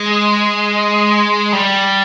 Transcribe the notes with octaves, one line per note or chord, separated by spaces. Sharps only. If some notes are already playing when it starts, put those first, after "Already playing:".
Already playing: G#3
G3